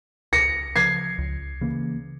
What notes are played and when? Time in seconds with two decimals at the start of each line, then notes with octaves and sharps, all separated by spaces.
0.33 C#2 A#6 C#7
0.76 C#3 F3 G#6 C7
1.18 C#2
1.61 C#3 E3 A#3